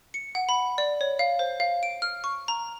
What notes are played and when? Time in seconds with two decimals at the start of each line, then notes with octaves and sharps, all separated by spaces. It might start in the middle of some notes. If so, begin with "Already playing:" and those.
0.14 C#7
0.35 F#5
0.49 B5
0.78 D5
1.01 C#5
1.19 F5
1.39 C5
1.60 F5
1.83 D7
2.02 F6
2.24 C#6
2.48 A#5